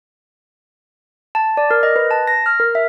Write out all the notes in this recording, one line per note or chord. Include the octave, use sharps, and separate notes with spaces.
A5
D5
A#4
D#5
B4
A5
A#6
F6
A#4
E5